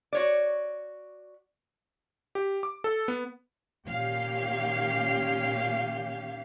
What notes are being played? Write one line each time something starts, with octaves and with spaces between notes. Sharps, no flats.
F#4 C#5 D5
G4
D6
A4
B3
A#2 D#3 C#4 G4 F5